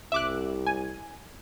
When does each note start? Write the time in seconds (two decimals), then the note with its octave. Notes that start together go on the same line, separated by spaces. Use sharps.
0.12 C2 E5 D6 F#6
0.66 G#5